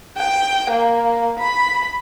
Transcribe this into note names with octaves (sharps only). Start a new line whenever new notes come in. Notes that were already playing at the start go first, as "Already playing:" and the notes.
G5
A#3
B5